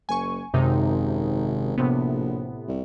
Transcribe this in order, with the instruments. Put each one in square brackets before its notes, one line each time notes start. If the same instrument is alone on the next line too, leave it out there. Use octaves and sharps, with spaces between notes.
[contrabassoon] F#1 [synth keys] G#5 C#6
[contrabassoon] G#1 [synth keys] F#2 C3 D#4
[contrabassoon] A#1 [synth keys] A2 C3 B3
[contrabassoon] C2